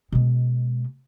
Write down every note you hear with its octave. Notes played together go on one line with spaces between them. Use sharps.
B2 G#3